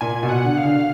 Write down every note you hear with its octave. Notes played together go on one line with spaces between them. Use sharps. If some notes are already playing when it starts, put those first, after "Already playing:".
A#2 G#5
B2
F#5
D3
F5
D3